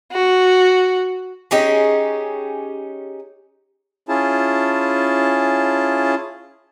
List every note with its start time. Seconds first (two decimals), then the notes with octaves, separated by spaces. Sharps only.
0.12 F#4
1.51 C#4 D#4 G4 G#4
4.08 C#4 E4 F4 G#4 A5